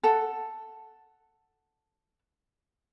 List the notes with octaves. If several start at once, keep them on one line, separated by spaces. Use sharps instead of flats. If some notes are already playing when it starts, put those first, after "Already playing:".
A4 F#5 A5